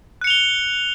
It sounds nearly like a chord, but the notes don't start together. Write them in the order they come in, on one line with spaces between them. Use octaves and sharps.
F#6 C#7 F7 G7